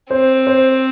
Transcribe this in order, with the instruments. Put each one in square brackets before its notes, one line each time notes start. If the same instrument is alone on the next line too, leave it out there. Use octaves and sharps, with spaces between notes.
[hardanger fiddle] C4 [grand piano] C5
[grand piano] C5